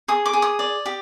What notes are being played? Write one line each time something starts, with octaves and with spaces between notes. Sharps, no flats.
G#4 D#6
D6
G#4
D#6
D5
G4